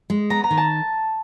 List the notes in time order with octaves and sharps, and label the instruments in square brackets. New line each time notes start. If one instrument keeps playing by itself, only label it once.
[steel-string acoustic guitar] G#3
[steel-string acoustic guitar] B3 [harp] A#5
[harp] A#5
[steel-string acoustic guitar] D#3
[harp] A5